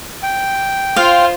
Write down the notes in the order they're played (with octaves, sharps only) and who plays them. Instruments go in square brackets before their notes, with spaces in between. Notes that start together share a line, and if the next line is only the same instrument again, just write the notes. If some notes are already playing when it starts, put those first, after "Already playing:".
[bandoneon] G5
[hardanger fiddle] F4 C5 [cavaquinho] F5